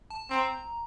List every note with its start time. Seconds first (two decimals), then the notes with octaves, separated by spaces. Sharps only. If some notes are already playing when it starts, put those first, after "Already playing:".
0.10 A5
0.30 C4 A#5